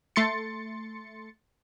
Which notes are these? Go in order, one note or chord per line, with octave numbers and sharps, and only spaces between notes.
A3 C6 A6 C#7